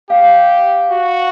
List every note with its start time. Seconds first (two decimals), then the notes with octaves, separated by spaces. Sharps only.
0.09 G4 F5
0.91 F#4